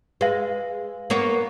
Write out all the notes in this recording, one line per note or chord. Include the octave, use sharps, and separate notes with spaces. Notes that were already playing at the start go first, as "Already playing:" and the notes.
G#3 B4 F5
A#3 B3 C#5